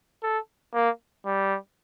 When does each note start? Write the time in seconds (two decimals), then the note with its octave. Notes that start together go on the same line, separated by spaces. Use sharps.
0.23 A4
0.74 A#3
1.26 G3